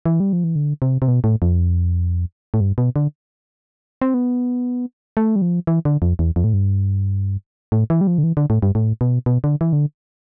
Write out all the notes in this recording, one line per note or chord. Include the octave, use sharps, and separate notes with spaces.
E3
G3
F3
E3
D3
C3
C3
B2
A2
F2
A2
G2
B2
D3
C4
B3
A3
G3
F3
E3
D3
F2
E2
F2
A2
G2
A2
E3
G3
F3
D3
E3
D3
A2
G2
A2
B2
B2
D3
E3
D3